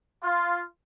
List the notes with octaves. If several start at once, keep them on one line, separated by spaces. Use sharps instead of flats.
F4